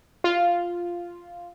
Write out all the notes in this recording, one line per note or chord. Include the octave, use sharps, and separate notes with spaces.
F4